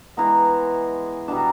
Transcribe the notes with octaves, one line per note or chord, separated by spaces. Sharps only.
E3 G#3 B3 A#5
B2 G3 B3 D4 A5
A#5